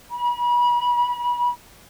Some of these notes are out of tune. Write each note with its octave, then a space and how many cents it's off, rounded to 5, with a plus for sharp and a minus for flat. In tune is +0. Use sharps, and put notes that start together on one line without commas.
B5 -35